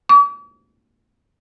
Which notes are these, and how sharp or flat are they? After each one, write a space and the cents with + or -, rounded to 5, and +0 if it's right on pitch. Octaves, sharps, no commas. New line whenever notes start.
D6 -45